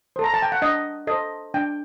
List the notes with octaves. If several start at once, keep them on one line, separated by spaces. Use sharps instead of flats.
A4 C5
A#5
A5
G5
F#5
D4 D#5
A4 C5 D#5
D4 G5